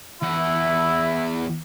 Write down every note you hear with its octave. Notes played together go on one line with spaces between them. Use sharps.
E2 E4 F#5